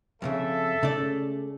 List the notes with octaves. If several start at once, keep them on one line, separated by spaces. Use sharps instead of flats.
F2 A2 C#3 A4 E5
C#3 A3 D5